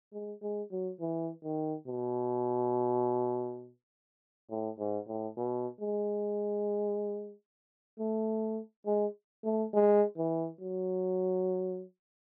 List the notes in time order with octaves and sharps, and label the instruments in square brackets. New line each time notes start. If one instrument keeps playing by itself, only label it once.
[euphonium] G#3
G#3
F#3
E3
D#3
B2
A2
G#2
A2
B2
G#3
A3
G#3
A3
G#3
E3
F#3